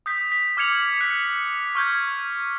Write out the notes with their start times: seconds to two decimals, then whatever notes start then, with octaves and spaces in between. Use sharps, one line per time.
0.06 D#6 G6 B6
0.32 B6
0.57 D6 F6 G#6 C#7 F7 F#7
1.01 F#6 B6 C#7
1.75 C#6 F6 G6 G#6